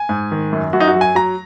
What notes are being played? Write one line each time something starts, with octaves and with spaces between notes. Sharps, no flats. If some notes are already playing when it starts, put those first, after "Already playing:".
Already playing: G#5
G#2
D#3
F#2
F#2 F#4
D#4
F#4
F#3
G#5
F#3 A#5